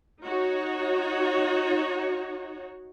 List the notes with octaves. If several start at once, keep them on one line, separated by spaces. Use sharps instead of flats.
D#4 F#4 C#5